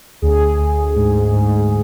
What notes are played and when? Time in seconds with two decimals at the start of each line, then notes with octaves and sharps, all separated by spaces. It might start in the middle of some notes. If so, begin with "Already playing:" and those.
0.22 D2 G#4
0.59 D2
0.96 G#2
1.32 G#2